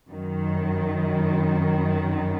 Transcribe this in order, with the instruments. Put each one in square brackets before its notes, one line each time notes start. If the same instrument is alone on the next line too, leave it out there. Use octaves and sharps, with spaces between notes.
[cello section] F#2 D#3